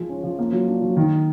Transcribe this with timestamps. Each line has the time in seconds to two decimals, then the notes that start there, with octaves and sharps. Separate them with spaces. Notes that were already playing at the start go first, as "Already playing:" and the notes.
Already playing: F3 G#3
0.09 C#4
0.24 F3
0.39 A#3
0.52 F#3
0.68 D4
0.81 F#3
0.97 D#3